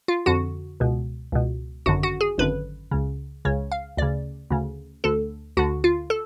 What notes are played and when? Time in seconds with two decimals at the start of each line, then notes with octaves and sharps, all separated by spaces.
0.08 F4
0.26 F2 D3 F#4
0.80 C#2 B2
1.32 C#2 B2
1.86 G#1 F#2 D3 F#4
2.03 F#4
2.21 G#4
2.38 G#1 F#2 D3 B4
2.91 C#2 C#3
3.45 C#2 C#3 C#5
3.72 F5
3.97 D2 C#3 D5
4.50 D2 C#3
5.04 D2 D3 A4
5.57 D2 D3 F#4
5.84 F4
6.10 A4